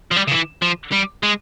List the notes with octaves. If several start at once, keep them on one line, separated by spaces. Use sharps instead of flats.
F3
G3
C#3
E3
F3
G3
G#3